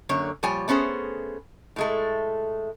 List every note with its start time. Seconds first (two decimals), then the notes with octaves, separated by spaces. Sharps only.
0.09 F#2 D3 A#3 C#5
0.43 A#2 F3 G3 C#5 G#5
0.68 A3 B3 C#4 G#4 C5
1.76 A2 G#3 A3